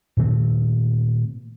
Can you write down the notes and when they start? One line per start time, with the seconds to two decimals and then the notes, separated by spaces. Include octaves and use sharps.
0.17 A#2 D#3 A3 C4